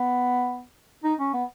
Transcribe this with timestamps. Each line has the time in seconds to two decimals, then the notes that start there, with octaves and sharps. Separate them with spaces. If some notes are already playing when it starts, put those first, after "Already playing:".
Already playing: B3
1.04 D#4
1.20 C#4
1.34 B3